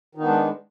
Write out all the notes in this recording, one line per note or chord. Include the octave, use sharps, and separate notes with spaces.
D#3 G#3 B3 D4 D#4